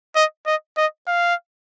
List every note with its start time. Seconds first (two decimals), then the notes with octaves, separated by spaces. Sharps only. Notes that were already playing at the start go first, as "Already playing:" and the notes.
0.15 D#5
0.46 D#5
0.77 D#5
1.07 F5